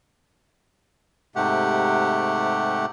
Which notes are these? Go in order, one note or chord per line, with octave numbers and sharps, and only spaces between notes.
G#2 C3 A3 G4 F#5